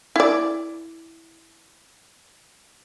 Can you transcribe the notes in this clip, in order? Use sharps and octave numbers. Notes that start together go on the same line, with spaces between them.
E4 D5